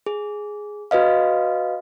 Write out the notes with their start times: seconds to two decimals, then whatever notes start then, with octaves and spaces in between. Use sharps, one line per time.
0.06 G#4
0.91 F#4 B4 D#5 F5